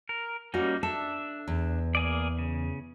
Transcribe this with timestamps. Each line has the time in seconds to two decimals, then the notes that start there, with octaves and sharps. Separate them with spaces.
0.09 A#4
0.54 G3 A#3 C#4 D#4 F#4
0.83 D4 A4 E5
1.48 E2
1.95 A#3 G#4 D5
2.39 C#3